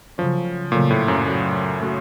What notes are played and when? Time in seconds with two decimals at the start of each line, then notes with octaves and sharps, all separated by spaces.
0.18 C#3 F3 F#3 A3 C#4
0.72 A#2 C#3 F#3 A3 C#4
0.91 A2
1.08 F#2
1.26 A3 C#4 F#4
1.80 A3 C#4 F#4